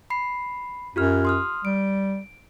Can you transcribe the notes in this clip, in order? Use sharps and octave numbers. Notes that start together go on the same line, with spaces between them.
B5 C7
F#2 F4 G4 F6
C6 D#6 F6
G3 D7